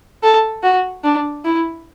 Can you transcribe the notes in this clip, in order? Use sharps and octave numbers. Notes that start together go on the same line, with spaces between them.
A4
F#4
D4
E4